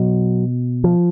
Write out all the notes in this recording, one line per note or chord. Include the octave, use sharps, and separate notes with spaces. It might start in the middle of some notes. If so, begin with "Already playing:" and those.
Already playing: B2 F#3
F3